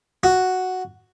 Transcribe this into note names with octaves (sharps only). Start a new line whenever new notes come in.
F#4